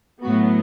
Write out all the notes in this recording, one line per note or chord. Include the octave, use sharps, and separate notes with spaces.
A2 F#3 B3 F#4